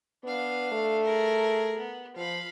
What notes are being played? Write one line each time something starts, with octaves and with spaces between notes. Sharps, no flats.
B3 D4 F5
A3
G#4 A#4
B3
F3 F5 B5